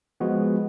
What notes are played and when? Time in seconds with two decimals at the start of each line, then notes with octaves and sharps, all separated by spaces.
0.20 F3 G#3 B3 F#4